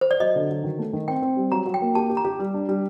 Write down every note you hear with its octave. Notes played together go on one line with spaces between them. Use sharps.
C5
D5
F#3 D#5
D3
F#3
D#3
A3
D#3
C4 G5
C4
G3
F#3 A#5
F#3
G5
A#3
G4 A5
G4
A#5
G4
G3
D4
G3